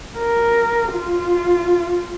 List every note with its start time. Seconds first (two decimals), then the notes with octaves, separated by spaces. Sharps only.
0.18 A#4
0.92 F4